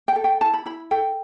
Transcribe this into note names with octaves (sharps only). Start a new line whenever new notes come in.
G5
A4
G5
E4 A5
B5
E4 B5
A4 G5